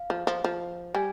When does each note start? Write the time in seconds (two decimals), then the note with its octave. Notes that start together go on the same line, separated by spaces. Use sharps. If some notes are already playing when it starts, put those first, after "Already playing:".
Already playing: F5
0.10 F3
0.27 F3
0.44 F3
0.95 G3 G#5